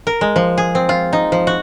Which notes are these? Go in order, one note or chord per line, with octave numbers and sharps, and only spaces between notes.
A#4
G#3
F3
G#4
C4
F4
D#4
F3
F#4